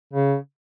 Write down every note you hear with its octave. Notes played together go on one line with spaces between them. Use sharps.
C#3